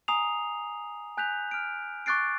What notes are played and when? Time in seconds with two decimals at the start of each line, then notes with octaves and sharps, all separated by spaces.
0.08 G#5 A#5 D#6 C7 F7
1.17 G#5 F#6 G6 B6 F7
1.51 F6 D7
2.06 C#6 D6 F#6 A6 C7 D7